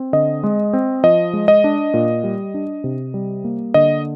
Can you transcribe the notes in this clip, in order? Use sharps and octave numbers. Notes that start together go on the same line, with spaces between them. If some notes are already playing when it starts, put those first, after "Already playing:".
Already playing: C4
D3 D#5
G#3
C4
F3 D#5
G#3
D#5
D4
A#2
G3
D4
C3
G3
A#3
D3 D#5